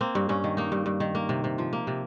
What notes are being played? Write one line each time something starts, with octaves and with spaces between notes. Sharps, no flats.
A#3 C4
G2
G2 C#4
D#3
A#3 D#4
G2
G2
D#3
A#3
C3
C3
F3
A#3
C3